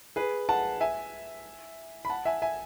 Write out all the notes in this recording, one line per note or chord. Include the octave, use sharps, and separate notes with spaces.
G#4 B4
F#5 A5
E5 G#5
B5
F#5 A5
E5 G#5
E5 G#5